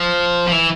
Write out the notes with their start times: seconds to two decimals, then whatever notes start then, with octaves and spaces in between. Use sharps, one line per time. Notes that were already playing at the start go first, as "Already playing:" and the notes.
Already playing: F3
0.48 F3
0.52 E3